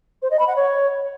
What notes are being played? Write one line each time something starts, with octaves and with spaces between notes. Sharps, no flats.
C5
D#5
B5
F#5
C#5